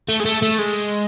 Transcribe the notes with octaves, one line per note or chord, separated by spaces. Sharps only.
A3
G#3
A3
A3
G#3